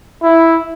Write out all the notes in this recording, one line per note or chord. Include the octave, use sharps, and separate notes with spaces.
E4